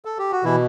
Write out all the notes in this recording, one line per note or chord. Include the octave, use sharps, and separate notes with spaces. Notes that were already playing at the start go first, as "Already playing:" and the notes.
A4
G4
F#4
B2 E3 E4